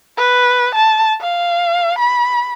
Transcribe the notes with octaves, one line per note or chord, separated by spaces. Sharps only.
B4
A5
F5
B5